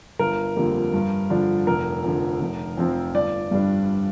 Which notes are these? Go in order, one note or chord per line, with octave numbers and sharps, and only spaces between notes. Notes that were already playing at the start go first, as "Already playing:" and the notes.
G1 A#4
F2 D3 G3 A#3
G2
D3 F3 D4
F1 A#4
F2 D3
F1
F2 F3 C4
G1 D5
G2 G3 D4